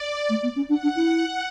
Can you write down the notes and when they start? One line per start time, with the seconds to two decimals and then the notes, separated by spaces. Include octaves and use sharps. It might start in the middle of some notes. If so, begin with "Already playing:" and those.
Already playing: D5
0.29 A3
0.42 B3
0.55 C#4
0.68 D4 F#5
0.82 D4
0.95 E4